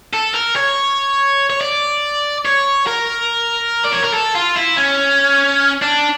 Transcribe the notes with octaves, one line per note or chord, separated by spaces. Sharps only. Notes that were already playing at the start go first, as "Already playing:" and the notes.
A4
A#4
C#5
C#5
D5
C#5
A#4
D5
C#5
A#4
A4
F4
E4
C#4
D4